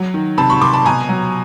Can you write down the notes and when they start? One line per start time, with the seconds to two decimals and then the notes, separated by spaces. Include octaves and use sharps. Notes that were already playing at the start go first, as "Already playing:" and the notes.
Already playing: F#3
0.14 D#3
0.38 C3 A5 B5
0.50 B5 C#6
0.61 C3 C6 D6
0.73 A5 B5
0.85 B2 G#5 A#5
1.09 F#3